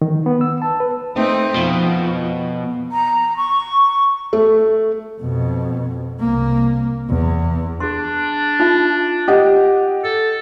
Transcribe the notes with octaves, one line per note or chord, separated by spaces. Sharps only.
D#3
B3
E6
A5
B4
A3 C4 D#4
F2 B2
A#5
C#6
A3
F2 B2
C2 A#3
E2
D4 G#4 C6
D#4 F4 E5
G4 D#5 F#5
A4